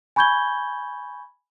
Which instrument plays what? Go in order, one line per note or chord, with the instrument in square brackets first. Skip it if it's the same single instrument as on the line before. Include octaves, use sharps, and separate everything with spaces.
[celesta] G#5 B5 C#6 G6 G#6 G7